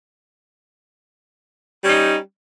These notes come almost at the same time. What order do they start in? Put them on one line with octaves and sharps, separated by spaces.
G3 C#4 D#4